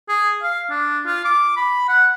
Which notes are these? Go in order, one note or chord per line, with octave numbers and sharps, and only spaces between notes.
G#4
F5
D4
F4
D6
B5
F#5